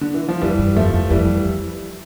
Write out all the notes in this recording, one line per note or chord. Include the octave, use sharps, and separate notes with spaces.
D3
E3
F3
F2 E3 G3
G2
F2 F3 A3
F2
F2 E3 G3